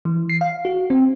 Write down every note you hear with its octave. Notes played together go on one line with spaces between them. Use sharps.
E3
C7
F5
F#4
C4